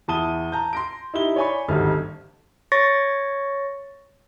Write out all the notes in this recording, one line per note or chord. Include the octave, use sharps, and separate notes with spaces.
E2 E4 A5 D#6 D#7 G7
A5 A#5 G6
C6 A#6 D7
D#4 E4 G4 G7
C#5 D5 G#5 B5 C#6
G#1 D2 G3 D#4 A4 F6
C#5 C#6 A6 A#6